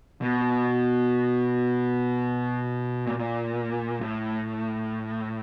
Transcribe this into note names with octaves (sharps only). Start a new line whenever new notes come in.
B2
A#2
A2